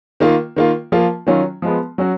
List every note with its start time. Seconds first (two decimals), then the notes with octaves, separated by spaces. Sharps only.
0.20 D#3 A#3 F4
0.56 D#3 A#3 F4
0.92 F3 A#3 F4
1.27 D#3 F#3 C#4 F4
1.62 F3 G#3 B3
1.98 F#3 C#4 F#4